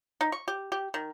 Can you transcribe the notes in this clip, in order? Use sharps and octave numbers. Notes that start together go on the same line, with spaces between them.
D#4
C#6
G4
G4
D#3